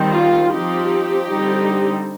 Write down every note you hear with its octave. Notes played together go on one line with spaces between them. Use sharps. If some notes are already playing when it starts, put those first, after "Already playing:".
Already playing: D#3 G3 C4
F4
F3 C4 D#4 G4
D3 G3 C4 D#4